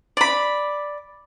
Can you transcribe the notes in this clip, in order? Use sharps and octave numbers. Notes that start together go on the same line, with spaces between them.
D5 B5